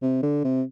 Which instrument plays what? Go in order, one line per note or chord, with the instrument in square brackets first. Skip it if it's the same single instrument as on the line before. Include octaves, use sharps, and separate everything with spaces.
[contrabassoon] C3
D3
C3